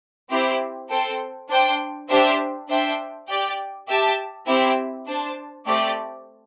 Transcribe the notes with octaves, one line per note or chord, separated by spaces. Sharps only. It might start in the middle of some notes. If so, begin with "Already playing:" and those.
C4 E4 G4 C5
C4 A4 C5 G5
D4 C5 G5
D4 G4 C5 E5
D4 C5 E5 G5
G4 D5 G5
G4 E5 A5
C4 E4 G4 E5
D4 C5 A5
A3 C4 G4 D5